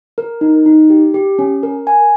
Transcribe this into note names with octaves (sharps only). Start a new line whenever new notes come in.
A#4
D#4
D#4
G4
G4
C#4
A#4
G#5